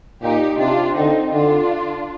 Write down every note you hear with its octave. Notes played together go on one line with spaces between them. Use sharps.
A#2 D#4 G4
C3 D4 F4
D3 C4 D#4
D3 D4 F4